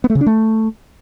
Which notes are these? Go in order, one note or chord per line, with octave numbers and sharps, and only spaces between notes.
B3
A3
C#3
D4
A3